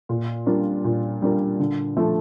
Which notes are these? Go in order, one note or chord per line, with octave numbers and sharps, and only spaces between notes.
A#2
G3 D4 F4 A#4
A#2
G3 D4 F4 A#4
D3
F3 A3